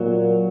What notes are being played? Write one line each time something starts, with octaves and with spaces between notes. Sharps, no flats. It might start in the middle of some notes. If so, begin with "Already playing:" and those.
Already playing: A#2 F#3